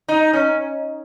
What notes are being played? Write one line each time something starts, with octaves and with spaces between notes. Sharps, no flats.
D#4
C#4